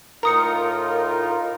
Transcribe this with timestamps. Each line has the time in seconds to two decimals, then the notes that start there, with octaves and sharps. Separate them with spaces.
0.23 A2 D#4 F4 A#4 A#5 D#6 C#7